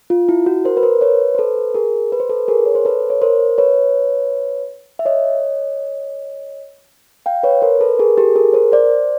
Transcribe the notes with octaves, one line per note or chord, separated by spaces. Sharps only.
F4
E4
F#4
A#4 C5
B4
A#4 C5
B4 C#5
C5
A4 B4
G#4 A#4
B4
C5
A4 B4
G#4 A#4
C#5
C5
A4 B4
C#5
A#4 C5
B4 C#5
E5
C#5 D#5
F5 G5
B4 C#5
A#4 C5
A4 B4
G#4 A#4
G4 A4
G#4 A#4
A#4 C5
C5 D5